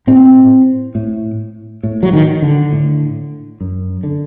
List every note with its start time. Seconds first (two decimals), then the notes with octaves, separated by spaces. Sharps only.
0.07 A2 C4
0.95 A2
1.83 A2
2.03 F#3
2.13 D#3
2.42 D3
2.72 A2
3.61 F#2
4.03 D3